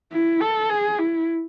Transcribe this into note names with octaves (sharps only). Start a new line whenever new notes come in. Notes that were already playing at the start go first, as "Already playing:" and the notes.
E4
A4
G#4
E4